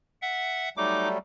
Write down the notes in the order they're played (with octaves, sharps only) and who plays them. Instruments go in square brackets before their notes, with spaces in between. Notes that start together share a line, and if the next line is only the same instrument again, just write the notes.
[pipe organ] E5 F#5
[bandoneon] F#3 G3 A3 [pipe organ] D#4 D6